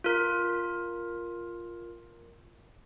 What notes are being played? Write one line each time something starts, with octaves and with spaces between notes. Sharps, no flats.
F4 A#4